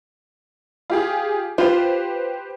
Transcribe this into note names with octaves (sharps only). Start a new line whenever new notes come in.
F4 G4 G#4
F4 G4 B4 C5